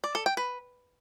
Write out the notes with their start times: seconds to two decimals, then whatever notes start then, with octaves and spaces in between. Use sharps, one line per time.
0.04 D5
0.15 A4
0.26 G5
0.37 B4